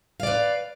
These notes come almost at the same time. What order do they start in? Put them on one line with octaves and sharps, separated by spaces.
F5 D5 B4